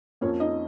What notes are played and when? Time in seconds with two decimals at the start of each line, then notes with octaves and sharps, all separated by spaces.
0.21 F2 F3 A#3 C#4 C#5
0.40 D#4 D#5